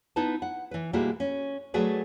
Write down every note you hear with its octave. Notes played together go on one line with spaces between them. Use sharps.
B3 D#4 E4 B4 A5
F#5
E3 B4
B2 G3 G#3 A#3 E4 F#4
C#4
F#3 A3 F#4 G#4 B4 D5